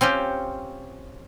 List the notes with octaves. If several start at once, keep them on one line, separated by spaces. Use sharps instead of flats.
C4 C#4 F4 G4